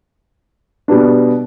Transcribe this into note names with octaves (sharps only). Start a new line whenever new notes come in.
B2 G3 B3 D4